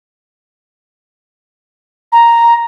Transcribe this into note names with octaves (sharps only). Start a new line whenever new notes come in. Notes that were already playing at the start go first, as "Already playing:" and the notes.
A#5